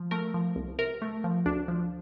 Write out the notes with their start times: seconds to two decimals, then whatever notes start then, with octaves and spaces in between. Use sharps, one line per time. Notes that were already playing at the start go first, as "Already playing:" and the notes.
Already playing: F3
0.11 A3 A#4
0.34 F3
0.56 C2
0.79 C3 A#4
1.02 A3
1.24 F3
1.46 D2 D4
1.68 F3